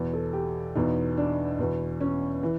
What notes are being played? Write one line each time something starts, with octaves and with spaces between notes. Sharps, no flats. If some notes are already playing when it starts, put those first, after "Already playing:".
Already playing: E2 B2
A4
G4
E2 B2 D#4
D4
E2 B2
C#4
E3